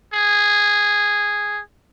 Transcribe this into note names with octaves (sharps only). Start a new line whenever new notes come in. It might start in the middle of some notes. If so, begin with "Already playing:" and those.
G#4